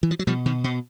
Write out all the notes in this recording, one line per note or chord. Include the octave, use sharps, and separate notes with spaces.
E3
F3
F#3
B2 F3 G3
B2 D#3
B2